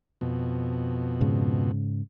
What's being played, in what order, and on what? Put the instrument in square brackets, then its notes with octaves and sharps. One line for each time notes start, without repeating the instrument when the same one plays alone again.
[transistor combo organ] F2 B2
[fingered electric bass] G#2 C#3